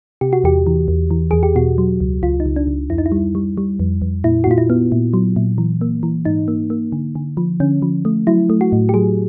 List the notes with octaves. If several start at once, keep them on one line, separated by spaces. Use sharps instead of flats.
C3 G4
F#4
E2 G4
E3
E2
E3
E2 G#4
G4
B2 F#4
F#3
C#2
C#2 F4
D#4
C#2
D4
C#2
F2 E4
D#4
E4
G3
G3
G3
F2
F2
A#2 E4
F#4
A#2 F4
E4
B3
A#2
F#3
A#2
E3
A#3
E3
G#2 D#4
A#3
A#3
D3
D3
F3
D3 C#4
F3
A3
F#3 E4
A3
F#4
A2
G4
F#3 G#4